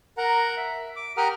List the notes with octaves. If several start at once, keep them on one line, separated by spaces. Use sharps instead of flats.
A#4 F#5 A#5
E5
D6
G4 A#4 F#5 A#5 D#6 F6